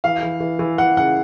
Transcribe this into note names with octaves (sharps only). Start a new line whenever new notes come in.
E3 F5
E3
E3
E3
E3 F#5
C#3 F#5